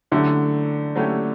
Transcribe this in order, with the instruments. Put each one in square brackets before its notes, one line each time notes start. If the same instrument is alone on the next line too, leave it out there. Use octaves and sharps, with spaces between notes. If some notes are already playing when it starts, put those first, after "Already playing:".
[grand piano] D3 [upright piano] F#3 A3 C#4 E4 G4
[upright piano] F#3 A3 C#4 E4 G4